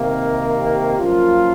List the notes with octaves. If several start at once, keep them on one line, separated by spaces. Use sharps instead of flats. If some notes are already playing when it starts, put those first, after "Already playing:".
Already playing: C3 D#3 A#3
F#2 F3 A#3 F4